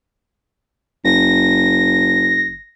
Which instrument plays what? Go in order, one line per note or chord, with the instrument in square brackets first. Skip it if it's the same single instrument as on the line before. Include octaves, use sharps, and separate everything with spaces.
[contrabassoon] F#1 [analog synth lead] A#6